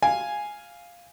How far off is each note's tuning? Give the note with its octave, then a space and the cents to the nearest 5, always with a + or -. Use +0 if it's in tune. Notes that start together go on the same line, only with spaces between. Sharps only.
F5 +0 G#5 +0